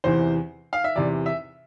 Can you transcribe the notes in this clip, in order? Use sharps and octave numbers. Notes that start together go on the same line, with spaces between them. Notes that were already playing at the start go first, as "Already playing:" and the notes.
E2 C3 E3 C5
F5
E5
E2 C3 E3 D5
E5